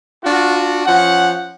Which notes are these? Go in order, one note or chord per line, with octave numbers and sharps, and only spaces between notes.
D4 F4 F#4
F3 C#4 F#5